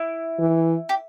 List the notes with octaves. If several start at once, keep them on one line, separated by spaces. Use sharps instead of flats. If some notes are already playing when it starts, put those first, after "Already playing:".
Already playing: E4
E3
G4